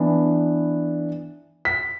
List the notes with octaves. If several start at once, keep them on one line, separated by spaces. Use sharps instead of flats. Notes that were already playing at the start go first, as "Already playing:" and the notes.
Already playing: E3 B3 D4
B6